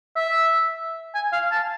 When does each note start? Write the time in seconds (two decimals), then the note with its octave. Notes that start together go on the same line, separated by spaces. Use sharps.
0.16 E5
1.14 G#5
1.33 F5
1.51 A5